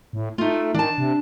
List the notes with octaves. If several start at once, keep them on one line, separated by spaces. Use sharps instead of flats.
A2
A3 D#4 F4
D#3 D4 A5
C3